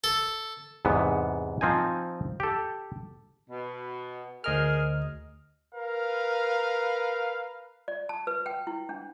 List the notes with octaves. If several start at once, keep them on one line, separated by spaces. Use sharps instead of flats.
A4
E2 G#2 C3 B3
F3 C4 D#4 G#5
G4 A4
B2
D2 G#4 A#4 C5 D#5 F6
A#4 B4 F5
D5
A5
B4
G5
E4
D4